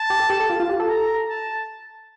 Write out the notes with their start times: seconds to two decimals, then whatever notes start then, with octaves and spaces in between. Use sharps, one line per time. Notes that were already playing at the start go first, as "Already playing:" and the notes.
Already playing: A5
0.10 G4
0.20 A4
0.30 G4
0.40 A4
0.50 F4
0.60 F4
0.69 G4
0.80 A4
0.89 A#5
1.29 A5